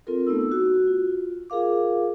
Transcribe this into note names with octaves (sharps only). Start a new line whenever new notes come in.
C4 F4 A4 A#4
A3 B3 D#4 E6
F#4
F4
F4 G#4 A#4 F5 D6